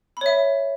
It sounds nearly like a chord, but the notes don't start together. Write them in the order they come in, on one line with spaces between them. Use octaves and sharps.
B5 C#5 E5